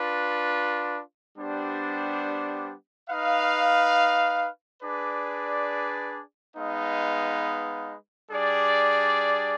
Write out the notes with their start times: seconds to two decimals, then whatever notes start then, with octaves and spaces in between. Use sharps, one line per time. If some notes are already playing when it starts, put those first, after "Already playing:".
Already playing: D4 F4 B4
1.36 G3 B3 D4 G4 C5
3.10 D#4 B4 F5
4.82 D4 G#4 B4 D5
6.56 G#3 B3 D#4 B4 F5
8.29 G3 D4 G#4 D5